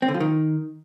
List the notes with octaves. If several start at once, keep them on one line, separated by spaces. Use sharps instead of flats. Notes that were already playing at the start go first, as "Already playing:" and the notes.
C4
D3
F3
D#3